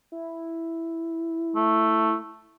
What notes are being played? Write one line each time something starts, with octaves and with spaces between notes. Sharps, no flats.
E4
A3